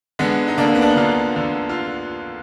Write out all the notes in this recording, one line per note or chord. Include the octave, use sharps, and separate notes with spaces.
D3 G#3 B3
D#4
D2 A#3 D4
A#3
B3
D4
D#4
D2 D4 F4
D3
F4